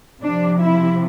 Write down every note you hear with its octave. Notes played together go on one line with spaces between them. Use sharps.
C3 F3 D4
E4